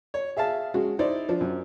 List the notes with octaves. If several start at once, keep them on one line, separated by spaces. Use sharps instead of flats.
C#5
G#4 E5 F5 A5
G#3 C#4 F#4
D#4 E4 C5 D5
F3 D4
F#2